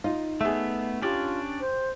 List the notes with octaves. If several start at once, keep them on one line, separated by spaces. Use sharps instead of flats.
D#4 F4
A3 B3 G#4 E5
C#4 D4 F4 G4 D5
C5